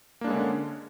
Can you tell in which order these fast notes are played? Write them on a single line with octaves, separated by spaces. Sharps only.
A#3 D4 G#3 C#4 D3